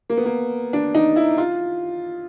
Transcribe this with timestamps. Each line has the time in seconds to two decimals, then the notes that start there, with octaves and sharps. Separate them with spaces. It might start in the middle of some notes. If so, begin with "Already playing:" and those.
0.10 A#3
0.17 B3
0.26 A#3
0.73 D4
0.95 D#4
1.16 E4
1.38 F4